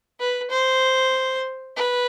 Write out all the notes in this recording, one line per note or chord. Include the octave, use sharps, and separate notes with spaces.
B4
C5
B4